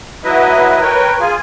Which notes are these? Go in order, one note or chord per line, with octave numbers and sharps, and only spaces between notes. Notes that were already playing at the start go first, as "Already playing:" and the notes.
F#3 E4 B4 D#5 E5
A#4 B4 C#5 G5
F4 G#4 G#5